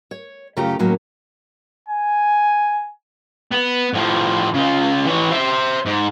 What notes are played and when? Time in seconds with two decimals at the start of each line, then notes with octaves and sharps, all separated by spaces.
0.11 C#5
0.57 F#2 C#3 A3 F4 G4 A#5
0.79 D#2 A2 F#3 A#3 C#4
1.88 G#5
3.52 B3
3.93 A2 F3
4.54 C#3 F4
5.06 E3 C#5
5.31 C5 E5
5.85 G#2